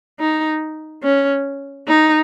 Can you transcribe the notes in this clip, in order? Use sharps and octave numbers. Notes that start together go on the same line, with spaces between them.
D#4
C#4
D#4